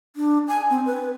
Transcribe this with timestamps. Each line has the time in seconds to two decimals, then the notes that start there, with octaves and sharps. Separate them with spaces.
0.16 D4
0.48 G#5
0.70 C4
0.86 B4